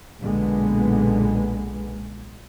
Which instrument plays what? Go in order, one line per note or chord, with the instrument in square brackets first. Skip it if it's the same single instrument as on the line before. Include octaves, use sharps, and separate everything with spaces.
[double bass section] B1 A#2 D3 G#3 B3